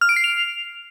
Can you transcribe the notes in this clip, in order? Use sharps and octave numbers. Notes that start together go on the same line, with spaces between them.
F6
D7
C7
F7